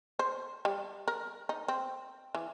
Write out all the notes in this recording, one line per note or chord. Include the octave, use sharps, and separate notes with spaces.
C5
G3
A#4
D#4
C4
E3